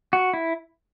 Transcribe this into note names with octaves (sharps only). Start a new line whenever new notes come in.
F#4
E4